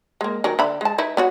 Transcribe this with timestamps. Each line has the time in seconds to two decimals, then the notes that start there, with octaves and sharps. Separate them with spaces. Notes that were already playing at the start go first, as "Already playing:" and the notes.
0.21 G#3 A#3
0.44 D#3 F#3 A#4
0.59 D3 E5 B5
0.81 G#3 A5
0.98 D#4 E4 B4
1.17 B3 F#4 C#5